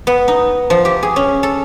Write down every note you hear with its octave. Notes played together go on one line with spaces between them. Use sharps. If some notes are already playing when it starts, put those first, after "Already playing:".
B3
D#4
F3
G4
G#4
C#4
A4